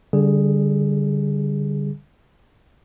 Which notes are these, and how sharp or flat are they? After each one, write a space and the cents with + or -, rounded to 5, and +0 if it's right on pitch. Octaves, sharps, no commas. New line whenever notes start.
D3 -25 G3 +0 G#4 +0